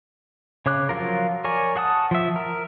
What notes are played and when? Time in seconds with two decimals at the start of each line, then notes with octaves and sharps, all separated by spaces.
0.66 C#3 C#5 D6 F#6
0.89 F3 F#3 F4 A#4
1.44 A#4 C#5 D5 G#5
1.76 G#4 F#5 A5 D#6
2.11 F3 E5
2.36 A#4